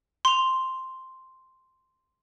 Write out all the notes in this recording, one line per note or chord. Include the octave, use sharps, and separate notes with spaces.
C6 F7